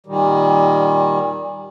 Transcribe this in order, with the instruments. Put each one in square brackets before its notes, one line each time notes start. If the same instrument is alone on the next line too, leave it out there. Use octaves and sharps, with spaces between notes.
[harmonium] A#2 D#3 G3